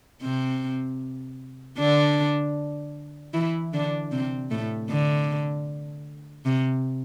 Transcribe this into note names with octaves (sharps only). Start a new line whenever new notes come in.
C3 C4
D3 D4
E3 E4
D3 D4
C3 C4
A2 A3
D3
C3